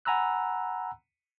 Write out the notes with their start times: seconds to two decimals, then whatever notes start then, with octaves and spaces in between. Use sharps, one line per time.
0.05 F#5 G#5 A#5 B5 E6 F#6